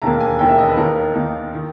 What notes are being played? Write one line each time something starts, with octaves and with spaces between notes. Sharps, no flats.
E1 D#2 D#3 A#3 A#5
G#5
E1 D#2 D#3 A#3 G5
E5
D#5
B4
D#2 D#3 A#3 D#4 A#4
D#2 D#3 A#3 D#4
D#3